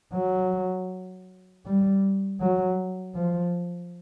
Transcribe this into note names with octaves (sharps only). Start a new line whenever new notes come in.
F#3
G3
F#3
F3